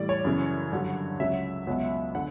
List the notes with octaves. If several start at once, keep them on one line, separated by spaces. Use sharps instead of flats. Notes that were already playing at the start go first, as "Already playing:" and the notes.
Already playing: A2 E3 G3 D5
C#5
F#2 C#3 E3
G2 D3 F#3
C#2 C#3 F#3 E5
C#2 B2 F#3
D3 F#5